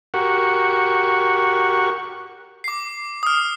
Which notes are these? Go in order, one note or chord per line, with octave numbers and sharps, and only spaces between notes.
F#4 G4 A#4 F#5 C#6
D6 C7
D#6 F6